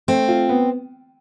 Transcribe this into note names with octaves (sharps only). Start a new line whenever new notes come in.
A3 C4
F4
B3